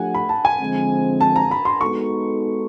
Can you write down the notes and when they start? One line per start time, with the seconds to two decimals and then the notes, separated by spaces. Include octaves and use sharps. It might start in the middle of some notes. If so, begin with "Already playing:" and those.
Already playing: F3 A3 D4 G4 F#5 G#5
0.15 B5
0.29 A5
0.45 G#5
0.60 D3 F3 G#3 C4
1.21 A5
1.36 A#5
1.51 B5
1.65 C6
1.81 G#3 B3 D#4 F#4 A4 C#6